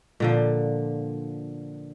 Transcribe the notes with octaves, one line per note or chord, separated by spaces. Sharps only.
A#2 D3 F3